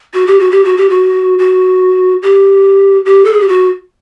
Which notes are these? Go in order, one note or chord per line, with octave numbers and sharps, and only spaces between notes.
F#4
G4
F#4
G4
F#4
G4
F#4
F#4
G4
G4
A4
G#4
G4
F#4